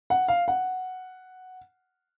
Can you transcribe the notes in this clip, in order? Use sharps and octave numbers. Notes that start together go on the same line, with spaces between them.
F#5
F5
F#5